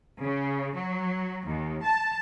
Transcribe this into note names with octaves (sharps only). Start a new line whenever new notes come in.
C#3
F#3
D#2
A5